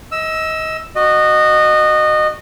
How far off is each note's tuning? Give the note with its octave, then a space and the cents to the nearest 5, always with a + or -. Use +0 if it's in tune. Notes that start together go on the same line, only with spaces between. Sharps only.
D#5 +25 E6 +0
F#4 +0 D#5 -20